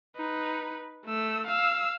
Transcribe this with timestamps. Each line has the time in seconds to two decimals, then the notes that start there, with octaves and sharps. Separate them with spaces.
0.16 D#4 B4
1.06 A3 E6
1.47 F5 E6